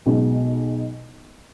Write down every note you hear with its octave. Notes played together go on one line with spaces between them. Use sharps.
B1 B2 G#3